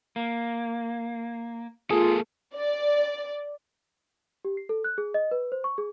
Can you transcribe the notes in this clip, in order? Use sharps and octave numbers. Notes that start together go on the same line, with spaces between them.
A#3
A#3 F4 G#4 A4
D5
G4
C7
A4
F#6
G#4
D#5
B4
C5
C#6
G#4